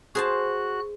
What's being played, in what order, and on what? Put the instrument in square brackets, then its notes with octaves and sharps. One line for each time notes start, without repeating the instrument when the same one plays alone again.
[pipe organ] F#4 F#6 [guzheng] G#4 C5 A5